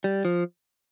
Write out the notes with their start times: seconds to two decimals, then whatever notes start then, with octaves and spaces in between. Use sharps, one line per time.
0.04 G3
0.25 F3